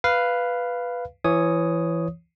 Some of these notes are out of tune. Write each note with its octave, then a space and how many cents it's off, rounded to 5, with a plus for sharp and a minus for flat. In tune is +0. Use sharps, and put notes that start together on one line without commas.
B4 +0 F5 -5
E3 +20 C#5 +0 D#6 +0